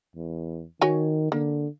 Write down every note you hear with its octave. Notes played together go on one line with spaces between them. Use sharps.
E2
D#3 F#4 C#5 G#5
D3 A#3